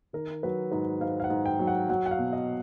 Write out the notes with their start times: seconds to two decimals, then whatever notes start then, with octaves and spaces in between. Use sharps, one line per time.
0.13 D#3 A#4
0.43 F#3 B4
0.72 G#2 B4
1.01 G#2 F5
1.20 F5
1.24 F#5
1.30 G#2
1.46 G5
1.59 F#3
1.67 F#5
1.89 F#3 F#5
2.06 F#5
2.11 F5
2.19 B2
2.33 D#5